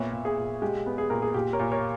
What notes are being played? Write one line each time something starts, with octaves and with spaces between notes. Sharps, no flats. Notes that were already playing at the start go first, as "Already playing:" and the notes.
Already playing: A#2 B3 C#5 E5
A#2
G#4
A#2
G#3 G4
B3
G#4
A#2 A#4
G#4
A#2 G4
A#4 C#5
A#2
A#4 C#5